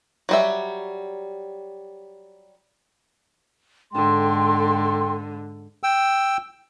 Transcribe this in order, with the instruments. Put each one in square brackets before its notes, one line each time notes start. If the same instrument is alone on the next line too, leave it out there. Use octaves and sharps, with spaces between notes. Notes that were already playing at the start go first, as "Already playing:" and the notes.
[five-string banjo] F#3 G3 E5
[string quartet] G#2 D3 [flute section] A4 G5 C6
[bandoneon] G5 E6